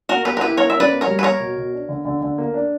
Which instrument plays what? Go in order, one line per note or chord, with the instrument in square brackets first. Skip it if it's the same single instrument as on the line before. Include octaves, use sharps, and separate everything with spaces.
[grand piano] A#3 [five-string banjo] F#4 A#4
[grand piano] A#3 [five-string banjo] G4 B4
[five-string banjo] A#4
[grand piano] E4 [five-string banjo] G4 B4
[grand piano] A#3 [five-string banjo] A#4 C#5
[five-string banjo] E5
[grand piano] C#4
[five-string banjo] B4 D5
[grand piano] A#3
[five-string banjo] A#4 C#5
[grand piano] G3
[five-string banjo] B4
[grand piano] A#3 [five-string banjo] A#4 C#5
[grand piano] B2
B2
D4
D3
D3
D3
A#3
D4